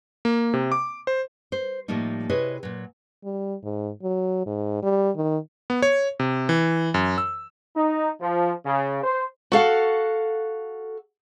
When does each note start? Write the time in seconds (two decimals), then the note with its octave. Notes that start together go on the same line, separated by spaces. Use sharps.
0.25 A#3
0.54 C3
0.72 D6
1.07 C5
1.52 C5
1.88 A2 F3 G3 A3 A#3 D#4
2.29 C3 E4 G#4 B4 C#5 D#5
2.63 A#2 F#3
3.24 G3
3.64 G#2
4.03 F#3
4.46 G#2
4.83 G3
5.16 D#3
5.70 B3
5.82 C#5
6.20 C3
6.49 E3
6.94 F#2
7.18 E6
7.76 D#4
8.20 F3
8.64 C#3
9.03 C5
9.52 F#4 A4 F5 F#5